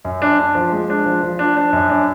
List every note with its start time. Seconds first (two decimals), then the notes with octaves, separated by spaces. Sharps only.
0.05 F#2
0.22 D4
0.39 D4
0.55 F3
0.72 G#3
0.90 D4
1.06 F3
1.23 F3
1.39 D4
1.57 D4
1.73 F#2
1.90 D4